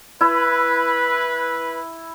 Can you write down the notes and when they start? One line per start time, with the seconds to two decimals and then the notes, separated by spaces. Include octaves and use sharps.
0.21 E4 B4